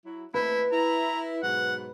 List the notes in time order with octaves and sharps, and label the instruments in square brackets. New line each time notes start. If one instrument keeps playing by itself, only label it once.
[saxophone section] F#3 E4
[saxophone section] A3 C4 [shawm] E4 [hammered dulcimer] B4
[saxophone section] E4 [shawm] A#5
[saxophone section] G#2 B2 F#3 [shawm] F#5